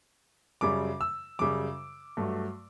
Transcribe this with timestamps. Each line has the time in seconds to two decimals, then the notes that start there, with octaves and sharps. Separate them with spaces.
0.61 F#2 C#3 G3 D6
1.01 E6
1.39 F#2 C#3 G3 D6
2.17 G2 F#3 A3